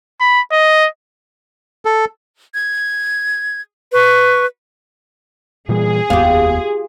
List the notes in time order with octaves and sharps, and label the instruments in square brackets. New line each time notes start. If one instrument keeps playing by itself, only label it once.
[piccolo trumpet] B5
D#5
[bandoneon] A4
[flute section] G#6
B4 C#6
[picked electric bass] A#2 E3 G3 [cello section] G#4
[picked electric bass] F1 D#2 B3 [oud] F4 G4